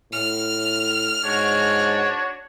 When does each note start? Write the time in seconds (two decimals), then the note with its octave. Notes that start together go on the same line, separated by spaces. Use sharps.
0.12 A2 F6
1.24 G#2 D4 F#4 C#5